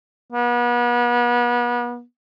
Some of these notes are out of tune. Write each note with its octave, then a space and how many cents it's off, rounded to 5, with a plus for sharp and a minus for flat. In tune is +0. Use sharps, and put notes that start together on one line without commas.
B3 -35